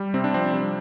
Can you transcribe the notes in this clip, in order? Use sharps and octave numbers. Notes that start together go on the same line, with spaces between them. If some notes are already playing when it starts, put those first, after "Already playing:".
Already playing: G3
C3 C4
D4
F3 C4
G3